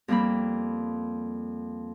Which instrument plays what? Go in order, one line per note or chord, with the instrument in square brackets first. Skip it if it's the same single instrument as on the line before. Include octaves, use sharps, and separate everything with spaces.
[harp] F2 G3 A#3 C4 B5